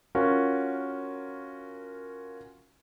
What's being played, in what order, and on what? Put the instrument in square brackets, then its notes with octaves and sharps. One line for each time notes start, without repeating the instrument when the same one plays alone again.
[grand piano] C#4 F4 F#4 A#4